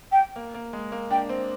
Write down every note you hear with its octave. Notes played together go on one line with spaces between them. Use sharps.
G5
A#3
A#3
G#3
A#3
D4 G5
C4